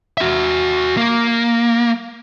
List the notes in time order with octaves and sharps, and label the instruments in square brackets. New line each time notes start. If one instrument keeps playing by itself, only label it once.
[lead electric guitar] F#4 E5
A#3